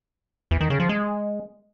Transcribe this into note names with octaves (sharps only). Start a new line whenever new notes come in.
E2
D#3
C#3
F3
G#3